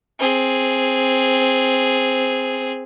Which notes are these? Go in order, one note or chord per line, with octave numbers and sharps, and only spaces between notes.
C4 G#4